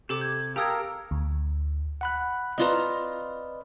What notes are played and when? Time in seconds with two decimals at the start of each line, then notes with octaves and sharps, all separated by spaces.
0.09 C3 G4 A4 D6
0.21 G6 G#6
0.56 G4 A4 A#4 F5 A#5 D#6 G#6
1.11 D2
2.01 F#5 B5 F#6
2.58 C4 F4 B4 D5 D#5 A#5